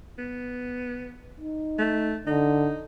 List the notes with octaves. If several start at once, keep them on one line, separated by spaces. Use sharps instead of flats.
B3
D#4
A3
D3 D#4